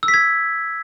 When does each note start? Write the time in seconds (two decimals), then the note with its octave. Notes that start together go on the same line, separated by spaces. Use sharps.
0.03 E6
0.08 B6
0.14 G#6